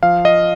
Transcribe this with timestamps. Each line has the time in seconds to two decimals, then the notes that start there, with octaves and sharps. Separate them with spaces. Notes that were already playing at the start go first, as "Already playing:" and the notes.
0.03 F3 F5
0.25 D#5